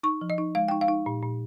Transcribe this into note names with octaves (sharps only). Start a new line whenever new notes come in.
D#4 C#6
F3
D#5
D#4
G#3 F5
D#4 G5
F5
D#4
A#2
A#2